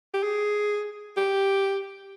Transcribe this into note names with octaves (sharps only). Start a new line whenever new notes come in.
G4
G#4
G4